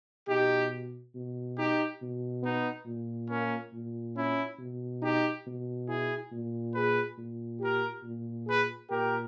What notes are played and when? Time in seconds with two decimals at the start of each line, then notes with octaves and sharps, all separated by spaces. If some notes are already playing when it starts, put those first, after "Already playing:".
0.28 B2 D#4 G4
1.15 B2
1.57 D#4 G4
2.01 B2
2.44 B3 D#4
2.86 A#2
3.30 A#3 C#4
3.73 A#2
4.16 C#4 E4
4.59 B2
5.02 D#4 G4
5.46 B2
5.88 E4 G#4
6.32 A#2
6.74 G#4 B4
7.18 A#2
7.61 G4 A#4
8.03 A#2
8.47 G#4 B4
8.90 A#2 G4 A#4